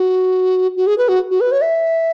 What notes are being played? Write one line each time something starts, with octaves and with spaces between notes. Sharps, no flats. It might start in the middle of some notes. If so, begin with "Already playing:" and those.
Already playing: F#4
F#4
G#4
B4
F#4
F#4
B4
C#5
E5